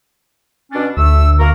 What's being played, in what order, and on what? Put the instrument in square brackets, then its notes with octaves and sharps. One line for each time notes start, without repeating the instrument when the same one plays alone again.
[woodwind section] B2 C#4 D4
[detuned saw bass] D2 [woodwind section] A3 E6
[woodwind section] A#3 F#4 A#4